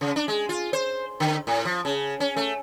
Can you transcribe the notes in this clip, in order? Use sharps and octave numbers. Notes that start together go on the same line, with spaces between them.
C#3
D4
G#3
F4
C5
D3
A2
F3
C#3
C#4
A3